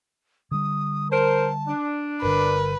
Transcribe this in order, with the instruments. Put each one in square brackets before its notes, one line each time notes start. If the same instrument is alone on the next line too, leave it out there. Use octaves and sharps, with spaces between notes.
[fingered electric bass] D3 G3 [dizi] D#6
[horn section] A#4 C5 [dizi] A5
[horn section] D4
[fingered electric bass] G1 G2 D3 [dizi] A#4 [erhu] B4